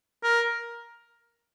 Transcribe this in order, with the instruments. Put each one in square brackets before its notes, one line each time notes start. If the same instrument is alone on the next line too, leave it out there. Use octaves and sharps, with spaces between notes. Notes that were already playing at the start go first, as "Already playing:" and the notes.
[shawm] A#4